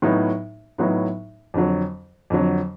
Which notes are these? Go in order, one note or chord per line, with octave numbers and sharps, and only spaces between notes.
A2 F#3 B3 D#4
A2 F#3 B3 D#4
F2 D3 F#3
F2 D3 F#3